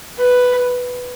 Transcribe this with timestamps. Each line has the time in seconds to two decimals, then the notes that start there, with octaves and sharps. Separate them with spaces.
0.19 B4